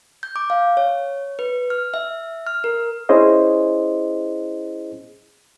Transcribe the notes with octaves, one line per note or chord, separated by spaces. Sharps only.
G6
D6
F5
C#5
B4
F6
E5
F6
A#4
C#4 E4 G#4 C5 D#5